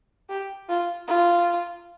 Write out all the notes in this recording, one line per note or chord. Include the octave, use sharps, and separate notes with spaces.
G4
F4
F4